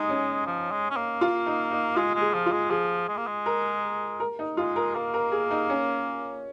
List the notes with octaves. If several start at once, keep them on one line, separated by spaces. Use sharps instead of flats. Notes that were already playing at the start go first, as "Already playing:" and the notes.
Already playing: G#3 D#4
C#4
F3
G#3
C#4
A#3
F4
D#4
D#4
G#3 F4
G#3
G#4
F3
F4
G#3
F3 G#4
G#3
A#3
G#3
A#4
A#4
D#4
G#3 F4
A#4
A#3 A#4
A#4
G#4
D#4
C#4